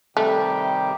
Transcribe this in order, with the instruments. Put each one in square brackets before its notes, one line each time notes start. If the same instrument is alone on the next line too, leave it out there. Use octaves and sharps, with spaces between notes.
[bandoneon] C3 D#3 G3 [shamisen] A3 [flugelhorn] G4